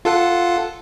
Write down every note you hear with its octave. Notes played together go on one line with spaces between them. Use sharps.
F4 A4 F#5